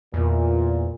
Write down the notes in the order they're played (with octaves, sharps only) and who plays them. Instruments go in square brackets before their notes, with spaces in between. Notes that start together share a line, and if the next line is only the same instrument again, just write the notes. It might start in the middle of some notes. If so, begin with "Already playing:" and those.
[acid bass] E2 [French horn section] A#2